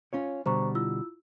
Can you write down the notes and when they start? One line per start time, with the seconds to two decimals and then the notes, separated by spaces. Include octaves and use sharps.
0.13 C#4 F4 C#5
0.46 B2 D3 G3 C5 A#5 C#6
0.75 E4 F4 E6